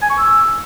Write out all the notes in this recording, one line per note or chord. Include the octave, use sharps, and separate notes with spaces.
G#5
C#6
E6